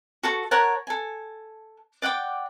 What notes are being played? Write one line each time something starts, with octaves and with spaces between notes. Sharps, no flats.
F#4 A4 C#6
A#4 C#5 F#5 A5
A4 G#5
D5 F#5 G5 D6